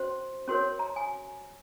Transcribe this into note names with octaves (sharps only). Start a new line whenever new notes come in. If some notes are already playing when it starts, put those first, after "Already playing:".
Already playing: C#4 F#4 C5 C6
C#4 F#4 A#4 C#5 C6
A#5
G#5